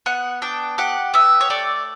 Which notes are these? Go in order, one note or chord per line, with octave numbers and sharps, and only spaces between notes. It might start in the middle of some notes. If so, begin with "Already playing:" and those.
B3 F#5
D4 G5
G4 F#5
B3 E5
C#5
A3 D5